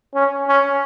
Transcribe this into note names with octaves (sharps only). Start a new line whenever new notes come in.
C#4
C#4